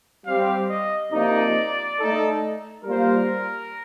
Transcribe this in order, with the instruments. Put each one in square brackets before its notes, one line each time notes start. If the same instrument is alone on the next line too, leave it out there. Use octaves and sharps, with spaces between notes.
[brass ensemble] G3 C4 G4 [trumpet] F5
[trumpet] D#5
[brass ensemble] C3 F3 A#3 D#4 [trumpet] D5
[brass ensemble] A3 D#4 A4
[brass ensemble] G3 A#3 F4 C5 [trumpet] A#4